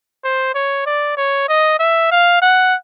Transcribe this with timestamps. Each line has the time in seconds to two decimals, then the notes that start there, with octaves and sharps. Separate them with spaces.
0.24 C5
0.55 C#5
0.86 D5
1.17 C#5
1.49 D#5
1.80 E5
2.12 F5
2.42 F#5